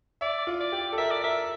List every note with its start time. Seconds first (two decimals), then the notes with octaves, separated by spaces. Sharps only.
0.21 D5 E5
0.47 F4
0.60 D5
0.72 G4
0.92 A4
0.98 A#4 E5
1.11 D5
1.24 A#4 E5